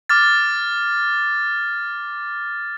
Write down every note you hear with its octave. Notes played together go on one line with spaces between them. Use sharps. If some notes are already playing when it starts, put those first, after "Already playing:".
D6 F6 A6